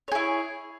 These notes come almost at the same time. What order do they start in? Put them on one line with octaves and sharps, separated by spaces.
C#5 G#4 E4